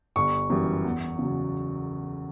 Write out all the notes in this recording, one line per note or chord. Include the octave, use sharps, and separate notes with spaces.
G1 C#6
F#2 E3 G3
E2
C#3 F#3